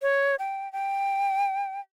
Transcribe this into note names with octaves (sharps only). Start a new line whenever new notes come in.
C#5
G5
G5